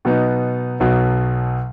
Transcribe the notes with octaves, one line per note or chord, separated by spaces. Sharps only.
B2 F#3 B3 D#4
B1 B2 F#3